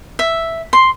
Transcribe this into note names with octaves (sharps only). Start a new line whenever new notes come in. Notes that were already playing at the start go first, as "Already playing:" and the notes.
E5
C6